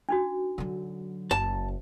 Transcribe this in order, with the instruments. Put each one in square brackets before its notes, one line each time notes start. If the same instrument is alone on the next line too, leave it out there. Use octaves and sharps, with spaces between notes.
[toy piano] D4 D#4 F#4
[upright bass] D3 F#3
[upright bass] F#1 [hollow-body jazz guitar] A5